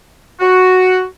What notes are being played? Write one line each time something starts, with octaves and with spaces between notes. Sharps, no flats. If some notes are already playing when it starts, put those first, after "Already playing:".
F#4